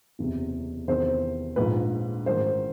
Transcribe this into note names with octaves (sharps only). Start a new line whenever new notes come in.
F#1 E2 C3
E2 C3 D#3 C5
A#1 G#2 F3 B4
A1 G#2 D#3 C5